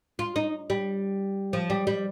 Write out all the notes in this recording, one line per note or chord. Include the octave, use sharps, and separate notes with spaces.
F4
D#4
G3
F3
G3
G3